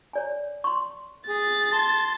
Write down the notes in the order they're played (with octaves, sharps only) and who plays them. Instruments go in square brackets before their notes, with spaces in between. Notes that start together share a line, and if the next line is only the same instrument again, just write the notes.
[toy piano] C#5 D5 G#5
C6 C#6
[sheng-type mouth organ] G#4 [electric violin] A6
[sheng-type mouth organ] A5 C6